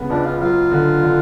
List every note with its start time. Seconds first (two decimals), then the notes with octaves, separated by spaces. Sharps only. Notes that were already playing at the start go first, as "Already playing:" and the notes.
Already playing: C#3 G#3 B3
0.09 C#2 D4
0.24 F4
0.40 F#3 F4
0.71 D3
1.03 D3